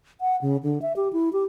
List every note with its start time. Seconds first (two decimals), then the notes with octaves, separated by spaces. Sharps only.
0.21 F#5
0.42 C#3
0.63 D3
0.82 E5
0.96 G4
1.13 E4
1.33 G4